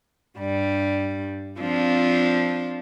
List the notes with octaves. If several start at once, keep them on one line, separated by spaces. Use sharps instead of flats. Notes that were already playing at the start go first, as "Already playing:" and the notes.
G2 G3
F3 C4 D4 F4